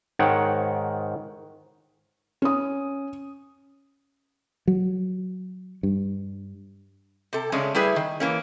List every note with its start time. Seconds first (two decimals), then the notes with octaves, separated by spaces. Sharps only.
0.19 G#2 D#3 C#5 F#5 G5
2.42 C#4 D#6
4.68 F#3
5.83 G2
7.33 C3 A4
7.52 C#3 G#3 A3 C#4 D4
7.75 G3 A3 E4 G#4 B4
7.96 D#3
8.20 E3 A#3 C#4